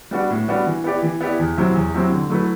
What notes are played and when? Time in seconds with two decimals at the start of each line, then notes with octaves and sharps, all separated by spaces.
0.11 G3 B3 D4 F#4
0.30 A2
0.48 G3 B3 D4 F#4
0.66 E3
0.84 B3 E4 G4 D5
1.03 E3
1.21 B3 E4 G4 D5
1.39 E2
1.57 C3 F#3 C4 E4
1.75 E2
1.94 C3 F#3 C4 E4
2.12 D3
2.30 F#3 A3 E4 B4